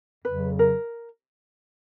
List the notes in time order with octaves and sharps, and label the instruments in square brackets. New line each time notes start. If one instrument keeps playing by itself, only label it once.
[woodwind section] F2 C#3 F#3 [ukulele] B4
[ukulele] A#4